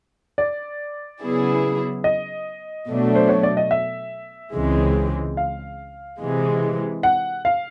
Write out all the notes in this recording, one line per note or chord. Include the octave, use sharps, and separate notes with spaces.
D5
C#3 F#3 B3 E4 G#4
D#5
B2 F#3 A3 D4
C5
C#5
D5
D#5
E5
C#2 C#3 E3 G#3 C4
F5
C3 E3 G#3
F#5
F5